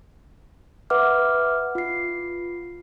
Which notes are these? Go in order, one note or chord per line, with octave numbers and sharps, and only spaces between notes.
B4 E5 F#5 D6 F6
F4 C7